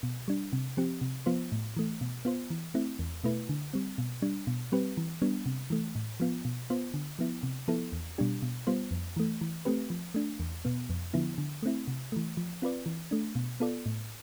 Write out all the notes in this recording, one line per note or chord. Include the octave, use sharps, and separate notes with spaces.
B2
G3 D4
C3
F3 C4 G4
C3
F3 B3 F4 C5
A2
E3 A3
B2
B3 F4 C5
E3
A3 C4 E4
E2
B2 A3 E4 B4
D3
G3 C4
B2
G3 D4
B2
G3 C4 G4 B4
E3
G3 B3 D4
C3
E3 A3
A2
F3 B3 F4
B2
B3 F4 C5
D3
F3 B3 E4
C3
F3 B3 E4 A4
E2
B2 G3 D4 G4
B2
G3 B3 F4 C5
F2
E3 A3
E3
A3 C4 G4 B4
F3
A3 D4
E2
B2 B3
F2
D3 F3 B3 E4
D3
A3 C4 E4
C3
E3 A3
F3
C4 F4 B4 D5
E3
A3 D4
B2
B3 F4 A4 D5
A2